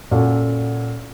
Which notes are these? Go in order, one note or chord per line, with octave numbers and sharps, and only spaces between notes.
A#2 C#4 F#4 A4